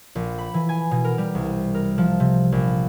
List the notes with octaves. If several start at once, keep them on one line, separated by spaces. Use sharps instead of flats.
A#1
B5
E3
G#5
B2
A#4
G3
C2
A#4
F3
C3
A#1